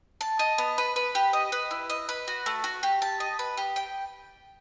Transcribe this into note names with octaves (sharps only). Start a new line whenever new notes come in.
A5
D#5
B3
B4
B4
G4
D#5
B4
E4
D#5
B4
F#4
A3
F#4
G4
A5
D#5
B4
G4
G5